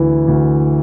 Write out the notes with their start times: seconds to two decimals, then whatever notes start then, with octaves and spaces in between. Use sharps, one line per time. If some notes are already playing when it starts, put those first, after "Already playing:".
Already playing: D2 E3
0.28 D2